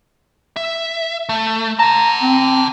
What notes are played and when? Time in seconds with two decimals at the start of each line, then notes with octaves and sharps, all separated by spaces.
0.56 E5
1.29 A3
1.79 F#5 A5 A#5
2.23 C4